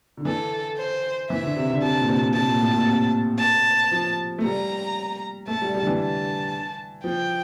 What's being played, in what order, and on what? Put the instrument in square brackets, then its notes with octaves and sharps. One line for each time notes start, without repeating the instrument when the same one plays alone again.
[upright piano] D3
[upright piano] E3 [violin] A4
[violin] C5
[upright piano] E3 [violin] E5
[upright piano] D3
C3
D3
[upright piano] C3 [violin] A5
[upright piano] A#2
C3
A#2
[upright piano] C3 [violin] A5
[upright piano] A#2
A2
A#2
C3
[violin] A5
[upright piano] F3
A3
[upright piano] G3 [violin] A#5
[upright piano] A3 [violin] A5
[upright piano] G3
G3
D3
E3
[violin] A5
[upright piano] F3 [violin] G5